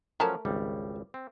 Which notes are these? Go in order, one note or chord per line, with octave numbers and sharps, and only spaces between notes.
F3 F#3 A3 C#4 A#4 A5
G#1 C#2 G3
C4